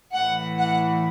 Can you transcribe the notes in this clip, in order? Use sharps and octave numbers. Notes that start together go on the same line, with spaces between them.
A2 E3 F#5
F#5